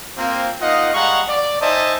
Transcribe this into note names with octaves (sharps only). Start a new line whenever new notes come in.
A#3 C4 F4
A#3 D#4 F4 D#5 F5 F#5
G3 G#3 F5 F#5 A#5 C#6
D5
D#4 C5 D#5 E5 G#5 A5